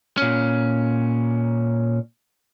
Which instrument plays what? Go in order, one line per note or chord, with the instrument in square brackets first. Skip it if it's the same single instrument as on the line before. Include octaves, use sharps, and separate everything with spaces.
[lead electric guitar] A#2 C#4